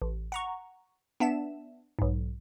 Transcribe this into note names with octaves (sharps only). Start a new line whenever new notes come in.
A1
F#5 A#5 C#6
B3 D4 E5 E7
B1 G#2